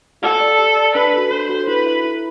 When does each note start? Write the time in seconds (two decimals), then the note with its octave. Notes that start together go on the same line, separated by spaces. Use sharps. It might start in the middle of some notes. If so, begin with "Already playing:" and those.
0.22 G4 A4
0.40 D5
0.45 A5
0.59 G4
0.77 D5 A5
0.95 D4 B4
1.14 F#4 A4
1.31 D4 C5
1.49 F#4 A4
1.68 E4 B4
1.86 A4 E5
2.04 E4